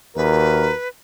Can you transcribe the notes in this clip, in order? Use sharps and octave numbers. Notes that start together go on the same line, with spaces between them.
D#2 F#4 A#4 B4